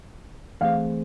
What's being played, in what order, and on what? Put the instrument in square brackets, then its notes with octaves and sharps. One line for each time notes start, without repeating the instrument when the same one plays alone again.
[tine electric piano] E3 A3 C4 G#4 C5 [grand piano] F5